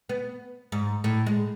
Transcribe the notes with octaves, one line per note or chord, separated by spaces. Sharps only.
B3
G#2
A2
G#3